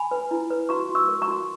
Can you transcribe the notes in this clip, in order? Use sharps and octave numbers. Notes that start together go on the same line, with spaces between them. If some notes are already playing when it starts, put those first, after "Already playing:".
Already playing: G#5 B5
B4
E4
B4
F#4 A#5 C#6
F#4
C#6 E6
A#4
A#5 C#6
F#4